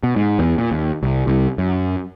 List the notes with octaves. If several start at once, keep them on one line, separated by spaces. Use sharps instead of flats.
B2
G#2
E2
A#2
D#2
C2
C2
F#2